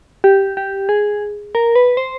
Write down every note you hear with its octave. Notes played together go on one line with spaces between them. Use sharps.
G4
G4
G#4
A#4
B4
C5